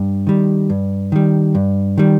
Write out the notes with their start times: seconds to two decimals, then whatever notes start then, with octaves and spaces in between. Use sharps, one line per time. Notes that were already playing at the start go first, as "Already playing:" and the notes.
Already playing: G2
0.27 D#3 G3
0.70 G2
1.12 D#3 G3
1.55 G2
1.98 D#3 G3